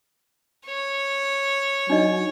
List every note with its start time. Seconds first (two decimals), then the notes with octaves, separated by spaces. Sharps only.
0.66 C#5
1.90 F#3 D4 D#4 D#5